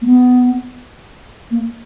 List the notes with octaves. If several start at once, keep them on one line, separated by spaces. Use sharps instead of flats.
A#3
B3
A#3